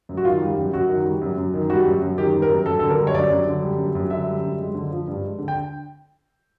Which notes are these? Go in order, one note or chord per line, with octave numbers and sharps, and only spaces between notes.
F#2
F#4
D#3 F4
G3
F#2
F#2 F#4
D#3
G3
F#2
F#2
D#3
G3 F#4
F#2
F#2
D#3 G4
G3
A#4
F#2
F#2 A4
D3 A4
A#4
G3
C#5
F#2 D5
F#2
D3
G3
F#2
F#2
D3 E5
G3
F#2
G#3
D3
F3
G2
G#3
D3
G5